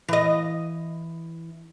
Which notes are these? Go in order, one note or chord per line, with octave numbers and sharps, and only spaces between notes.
E3 D#5